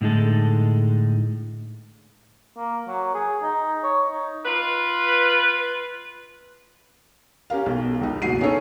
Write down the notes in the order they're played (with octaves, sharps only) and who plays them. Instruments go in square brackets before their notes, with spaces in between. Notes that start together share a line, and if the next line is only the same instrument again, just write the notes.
[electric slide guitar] A2 D3 G#3 D#4 A4
[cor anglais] A#3
F#3
G#4
D#4
C#5
D#4
[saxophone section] F4 B4
[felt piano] C#4 G4 A#4 F5
B1
C#2 D#4
F#1 B1 F#4 C7 D#7
C#4 D#4 G#4 A4 C#5